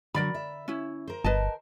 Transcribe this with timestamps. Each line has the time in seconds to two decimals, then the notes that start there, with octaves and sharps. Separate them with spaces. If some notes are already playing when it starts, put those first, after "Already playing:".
0.14 D3 F#3 A#4 D5 B5
0.35 E5
0.68 C#4 E4
1.08 A#4 C5
1.24 G1 B4 D#5 A5